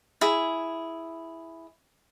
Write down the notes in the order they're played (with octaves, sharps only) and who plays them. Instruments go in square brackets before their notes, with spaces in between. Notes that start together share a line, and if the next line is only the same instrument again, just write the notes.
[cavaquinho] E4 G#4